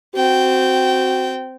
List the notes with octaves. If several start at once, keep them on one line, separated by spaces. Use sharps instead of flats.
C4 F#4 G5